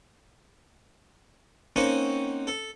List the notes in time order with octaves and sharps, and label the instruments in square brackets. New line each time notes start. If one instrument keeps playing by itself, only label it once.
[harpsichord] A#3 C4 C#4 D#4 F#4
A4